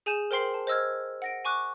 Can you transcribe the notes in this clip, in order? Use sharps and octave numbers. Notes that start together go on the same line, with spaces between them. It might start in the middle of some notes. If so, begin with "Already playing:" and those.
G#4 G#5 G6 E7
A#4 C5 G5 C6 C7 F#7
A5
C5 D#5 E6 F6 G#6
F#5 A#6 D7
G#5 C#6 D6 F#6